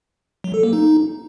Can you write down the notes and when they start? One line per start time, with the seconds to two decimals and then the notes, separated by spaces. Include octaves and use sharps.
0.44 F#3
0.54 A4
0.63 A#3
0.73 D#4